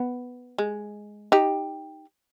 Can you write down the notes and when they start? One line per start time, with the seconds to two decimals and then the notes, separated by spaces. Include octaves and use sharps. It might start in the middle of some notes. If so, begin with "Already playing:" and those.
Already playing: B3
0.58 G#3
1.32 D#4 G4